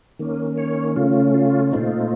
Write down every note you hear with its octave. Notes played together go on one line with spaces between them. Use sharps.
D#3 A#3 C#4
C#5
C#3 A3 C#4 F4
F4
A#2 A3 C4 D#4 F4